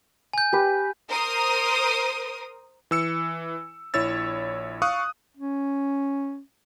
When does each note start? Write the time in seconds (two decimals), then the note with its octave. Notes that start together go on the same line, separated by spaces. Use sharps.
0.33 G#5 G6
0.53 G4 B4
1.07 A#4 C5 D#6
2.91 E3 E6 C#7
3.94 A#1 E4 C#5 E6 A6
4.82 F5 C#6 D#6 F#6
5.37 C#4